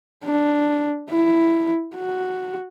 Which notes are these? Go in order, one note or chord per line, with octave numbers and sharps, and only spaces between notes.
D4
E4
F#4